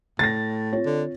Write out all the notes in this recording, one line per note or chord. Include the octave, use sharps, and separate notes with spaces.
A2 A6 A#6
C4 F4 C#5
D3